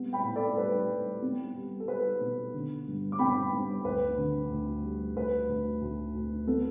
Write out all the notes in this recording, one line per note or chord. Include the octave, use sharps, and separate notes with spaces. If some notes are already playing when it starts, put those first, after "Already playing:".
Already playing: G3 B3
G5 B5
A2
A4 D5
G3 B4
G3
B3
G3
A4
G3 B4
B2
D3
G2
D6
B3 G5 B5
G2
D2 B4
D3
D2
G3
D2 B4
D2
D2
D2
B3 A4